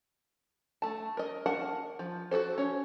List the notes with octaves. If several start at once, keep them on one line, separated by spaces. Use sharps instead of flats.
A3 A5
A#4 D#5
A#4 F#5 A5
F3
F#4 G#4 A4 C5
C#4 C#5